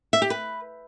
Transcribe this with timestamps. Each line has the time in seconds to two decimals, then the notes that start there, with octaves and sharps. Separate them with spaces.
0.13 E5
0.22 G4
0.30 B4